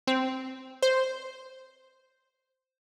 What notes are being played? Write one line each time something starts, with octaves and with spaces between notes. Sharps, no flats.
C4
C5